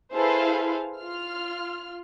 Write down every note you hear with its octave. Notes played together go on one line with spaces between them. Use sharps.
E4 G#4 A4 B4 C5 F5
F4 F6